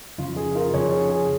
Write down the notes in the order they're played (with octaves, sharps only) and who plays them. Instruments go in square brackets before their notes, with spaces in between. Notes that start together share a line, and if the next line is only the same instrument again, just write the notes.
[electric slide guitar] F2 C#3 F3 [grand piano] F4
[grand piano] G#4
F4 A#4
[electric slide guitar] F2 C#3 F3 [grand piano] G#4 C#5
[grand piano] G#4
G#4